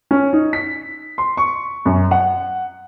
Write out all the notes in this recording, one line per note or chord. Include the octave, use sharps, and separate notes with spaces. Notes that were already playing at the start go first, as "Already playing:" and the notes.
C#4
D#4
B6
C6
C#6
F#2
F#5